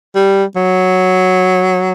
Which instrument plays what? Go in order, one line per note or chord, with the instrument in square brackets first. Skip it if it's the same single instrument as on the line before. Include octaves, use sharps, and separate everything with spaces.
[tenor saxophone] G3
F#3